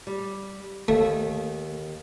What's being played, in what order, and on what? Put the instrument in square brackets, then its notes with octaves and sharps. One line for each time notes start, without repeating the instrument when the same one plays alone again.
[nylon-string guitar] G3
[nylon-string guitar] D#2 [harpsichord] A3